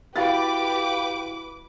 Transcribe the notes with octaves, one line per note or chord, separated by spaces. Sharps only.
E4 F#4 G4 B4 F5 D6 A6